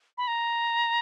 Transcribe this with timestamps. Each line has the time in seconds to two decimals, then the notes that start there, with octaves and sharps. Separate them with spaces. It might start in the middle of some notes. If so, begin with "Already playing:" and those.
0.18 B5
0.28 A#5